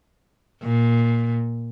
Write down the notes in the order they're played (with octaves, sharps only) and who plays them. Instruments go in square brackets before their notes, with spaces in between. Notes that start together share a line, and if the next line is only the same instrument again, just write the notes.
[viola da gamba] A#2